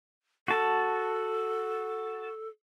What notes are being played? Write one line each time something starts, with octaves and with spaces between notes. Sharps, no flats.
F#4 A4 A5